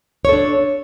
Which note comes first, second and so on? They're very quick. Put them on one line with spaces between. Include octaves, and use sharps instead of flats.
C#5 A4 D4